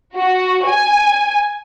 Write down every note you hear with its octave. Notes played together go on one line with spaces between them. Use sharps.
F#4
G#5